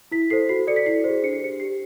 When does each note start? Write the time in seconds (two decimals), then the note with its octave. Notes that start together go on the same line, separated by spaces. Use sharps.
0.11 E4 B6
0.30 A4 C5 C7
0.49 F#4 C7
0.67 A4 D5 C#7
0.76 B6
0.86 E4 C7
1.04 G#4 C5
1.23 D4 C#7
1.33 C7
1.41 G4 C5 C#7
1.60 G4 C7